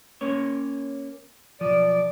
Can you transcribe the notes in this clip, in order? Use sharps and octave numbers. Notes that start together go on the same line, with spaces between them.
A#3 C#4 C#5
B1 F3 D5